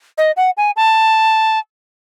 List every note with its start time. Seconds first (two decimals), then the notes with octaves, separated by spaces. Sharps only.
0.18 D#5
0.37 F#5
0.57 G#5
0.76 A5